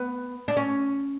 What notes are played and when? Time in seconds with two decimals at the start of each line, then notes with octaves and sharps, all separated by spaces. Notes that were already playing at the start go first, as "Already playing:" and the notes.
Already playing: B3
0.48 D4
0.57 C#4